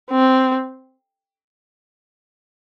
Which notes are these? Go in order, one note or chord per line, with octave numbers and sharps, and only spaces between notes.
C4